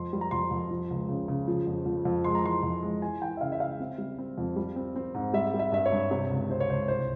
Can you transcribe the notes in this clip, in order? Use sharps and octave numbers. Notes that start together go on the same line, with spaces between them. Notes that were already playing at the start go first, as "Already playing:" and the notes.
Already playing: F2 C6
G3
A#5
F2 C6
F2
F3
C#2
C#3
C#3
F3
F2
F2
F2
G#3 C6
A#5
E3 C6
F2
G#3
E3 G#5
E3 G5
E5
C#3 F5
E5
C#3 F5
C4
G3
C4
F2
G3
C4
C4
G#2
G3 E5
G3
E5
G2 E5
C#5
G2
C3 C#5
C#2
C3 C5
C#5
C#2 C5
C2 C5